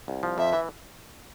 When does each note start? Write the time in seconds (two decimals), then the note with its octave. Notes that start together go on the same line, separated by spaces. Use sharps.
0.08 C2
0.23 F3
0.38 F2 E5
0.53 E3